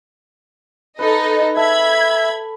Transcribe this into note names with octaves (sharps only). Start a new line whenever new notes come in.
D#4 A4 B4 D#5
A4 E5 B5 G#6